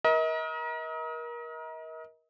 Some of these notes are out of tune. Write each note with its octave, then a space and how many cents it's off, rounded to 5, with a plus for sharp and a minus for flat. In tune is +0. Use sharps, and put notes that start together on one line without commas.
A#4 +30 D#5 +40